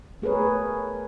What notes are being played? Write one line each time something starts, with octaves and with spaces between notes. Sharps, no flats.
A3 G#4 A#4 B4 C#5